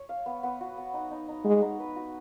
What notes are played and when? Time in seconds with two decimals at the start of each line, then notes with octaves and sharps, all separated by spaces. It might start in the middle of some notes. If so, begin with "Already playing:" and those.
Already playing: C#5
0.09 F5
0.26 B3
0.43 B3
0.61 F#4
0.78 B3
0.94 D#4
1.11 D#4
1.28 D#4
1.45 G#3 F#4
1.62 D#4
1.79 B4
1.96 F#4